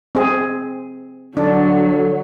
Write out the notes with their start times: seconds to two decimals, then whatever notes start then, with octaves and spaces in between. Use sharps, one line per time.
0.15 C4 G#4
1.37 D3 F#3 D4